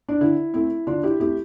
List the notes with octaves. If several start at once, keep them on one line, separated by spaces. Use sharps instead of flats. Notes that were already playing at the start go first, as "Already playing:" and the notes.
D4
D3 E4
A3 C4 E4
D3 D4 F4
E4 G4
A3 C4 E4 G4